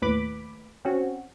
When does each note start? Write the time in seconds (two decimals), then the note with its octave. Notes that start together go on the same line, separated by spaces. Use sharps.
0.02 D#2 A2 B4 B5 D6
0.85 C4 C#4 F#4